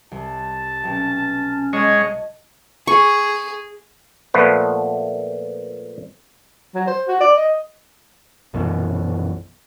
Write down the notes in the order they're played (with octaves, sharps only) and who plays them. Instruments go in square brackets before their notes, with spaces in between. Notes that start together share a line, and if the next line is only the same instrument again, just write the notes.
[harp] C2 [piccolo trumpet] A5
[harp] B1 [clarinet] C#4
[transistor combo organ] G#3 C#5 [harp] D#5 A5 C#6
[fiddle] G#4 [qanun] C#6
[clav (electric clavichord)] A#2 F3 A3 B3 B4
[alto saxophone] F#3
C5
F#4
D5
D#5
[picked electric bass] A#1 F#2 B2 E3